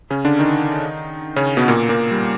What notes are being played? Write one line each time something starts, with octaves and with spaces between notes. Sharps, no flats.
C#3 C#4
D3 D4
D#3 D#4
C#3 C#4
B2 B3
A#2 A#3
A#2 A#3
G3